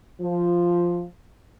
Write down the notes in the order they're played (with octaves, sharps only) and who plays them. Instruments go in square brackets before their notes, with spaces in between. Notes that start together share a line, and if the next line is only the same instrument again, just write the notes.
[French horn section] F3